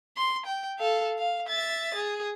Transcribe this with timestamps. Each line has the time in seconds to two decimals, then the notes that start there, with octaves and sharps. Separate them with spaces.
0.17 C6
0.46 G5
0.79 A4 F5
1.18 F5
1.48 E5 A6
1.95 G#4